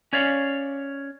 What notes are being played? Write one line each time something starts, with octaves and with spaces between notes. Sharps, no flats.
C#4 C#5 D5 F5